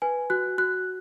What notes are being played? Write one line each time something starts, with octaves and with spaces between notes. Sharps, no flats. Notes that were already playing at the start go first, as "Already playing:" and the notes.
B4 G#5
F#4 F#6
F#4 F#6